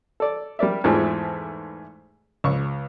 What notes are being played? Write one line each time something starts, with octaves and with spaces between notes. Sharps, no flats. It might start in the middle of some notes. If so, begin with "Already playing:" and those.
A4 D5
G3 A#4 D5 E5
E2 G#2 E3 F3 A3
C#2 C#6